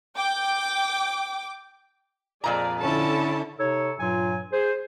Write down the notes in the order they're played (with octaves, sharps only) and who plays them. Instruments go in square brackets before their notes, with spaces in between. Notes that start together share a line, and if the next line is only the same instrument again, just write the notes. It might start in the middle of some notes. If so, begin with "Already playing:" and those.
[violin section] G5 D6
[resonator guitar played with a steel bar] F2 A#2 A#5 [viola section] G#4 D5
[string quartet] D3 C#4 E4 [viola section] A4 A5
[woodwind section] C3 D#4 A4 C#5
G2 A#2 F#3 F4 G#5
G#4 C5